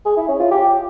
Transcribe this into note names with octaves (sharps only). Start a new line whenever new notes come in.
G#4
E4
C#4
F4
G4